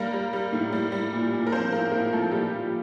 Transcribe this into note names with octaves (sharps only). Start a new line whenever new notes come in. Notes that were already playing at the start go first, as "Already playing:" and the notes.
Already playing: G3 A#3 A#4
G3
G3
A2
G3
G3
A#2
A#2
A#4
F3 C4 C5
A2 A#3 A#4
A2 A#3 A#4
F3 A3 A4
A#2 G3 G4
F3 F4